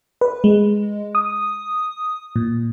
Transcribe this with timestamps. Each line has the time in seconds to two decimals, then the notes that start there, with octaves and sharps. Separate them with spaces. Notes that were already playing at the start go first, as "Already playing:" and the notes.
0.21 B4
0.44 G#3
1.15 D#6
2.36 A#2